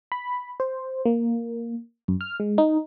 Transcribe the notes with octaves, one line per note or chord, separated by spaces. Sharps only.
B5
C5
A#3
F#2
F6
G#3
D#4